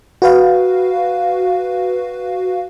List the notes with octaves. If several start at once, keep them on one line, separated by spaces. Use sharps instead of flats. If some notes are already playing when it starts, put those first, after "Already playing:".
F#4 B4 F5